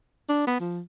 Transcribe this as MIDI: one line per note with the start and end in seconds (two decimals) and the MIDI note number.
0.29 0.44 62
0.47 0.60 59
0.60 0.80 53